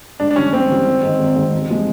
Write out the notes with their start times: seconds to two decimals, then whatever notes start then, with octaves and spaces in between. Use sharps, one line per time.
0.20 G#2 D4
0.31 D4
0.36 E3 G3 C#4
0.52 G#2 C4
0.69 E3 G3
0.86 G#1
1.03 G#2 D#3
1.20 G#1
1.36 G#2 D#3
1.52 E1
1.70 C3 F3 G#3